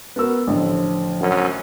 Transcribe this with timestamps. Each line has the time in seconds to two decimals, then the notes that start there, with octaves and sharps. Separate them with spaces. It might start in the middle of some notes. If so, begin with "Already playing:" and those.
0.16 B3 F#4 A#4 E6
0.47 A1 A2 D3 F3
1.21 F#2